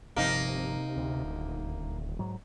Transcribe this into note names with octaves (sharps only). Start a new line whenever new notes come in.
G1 C3 F3 A#3 D#4
D2
D#1
G#2 F#3